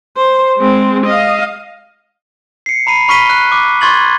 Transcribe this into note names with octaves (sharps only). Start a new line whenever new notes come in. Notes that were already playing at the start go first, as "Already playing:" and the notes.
C5
G#3 C4
D#5 F5
C7 C#7
A#5 B5 C7 D#7
B5 C#6 F6 B6 D#7 G7
F#6
D6
C6 C#6 G#6 A6 F#7